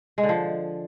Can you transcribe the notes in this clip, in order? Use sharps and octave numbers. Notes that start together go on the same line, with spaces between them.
G#3
D3
F3